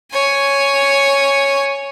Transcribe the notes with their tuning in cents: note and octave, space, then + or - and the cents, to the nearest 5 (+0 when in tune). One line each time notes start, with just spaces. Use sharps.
C#5 +0 G#5 +0